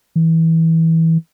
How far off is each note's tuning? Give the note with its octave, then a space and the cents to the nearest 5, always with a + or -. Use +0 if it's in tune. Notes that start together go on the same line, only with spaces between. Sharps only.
E3 -20